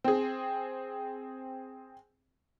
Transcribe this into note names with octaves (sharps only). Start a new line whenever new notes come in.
C4 G#4